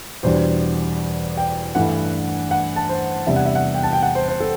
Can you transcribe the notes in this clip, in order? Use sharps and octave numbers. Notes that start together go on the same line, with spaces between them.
E2 B2 G3 D4 C5
G5
G2 E3 A3 D4 F#5
F#5
A5
C5
E2 C3 G3 B3 D4 E5
F#5
E5
F#5
G5
A5
G5
F#5
C5
C5
A4